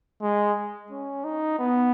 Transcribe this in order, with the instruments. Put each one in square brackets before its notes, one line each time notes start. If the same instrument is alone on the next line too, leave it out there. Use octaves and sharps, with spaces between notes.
[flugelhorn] G#3
C#4
D#4
B3